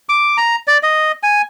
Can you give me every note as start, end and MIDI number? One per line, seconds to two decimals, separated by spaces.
0.09 0.37 86
0.37 0.56 82
0.67 0.78 74
0.83 1.12 75
1.23 1.42 80